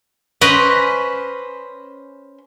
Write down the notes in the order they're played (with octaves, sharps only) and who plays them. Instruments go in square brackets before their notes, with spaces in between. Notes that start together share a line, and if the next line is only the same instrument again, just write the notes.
[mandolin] C#4 C5 [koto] B4 D#5